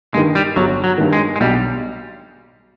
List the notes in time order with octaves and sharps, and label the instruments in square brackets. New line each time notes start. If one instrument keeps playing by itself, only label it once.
[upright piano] G2 D#3 [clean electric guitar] G#3
[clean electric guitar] G3
[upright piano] G1 [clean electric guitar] F#3
[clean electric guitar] F#3
[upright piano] G2 D#3
[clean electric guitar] G#3
G#3
[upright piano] B1 [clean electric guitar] G3